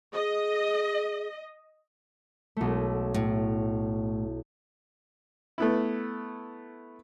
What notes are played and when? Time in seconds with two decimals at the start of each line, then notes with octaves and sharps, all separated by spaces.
0.14 G#4 D#5
2.57 B1 A3
3.14 A2
5.58 A3 B3 E4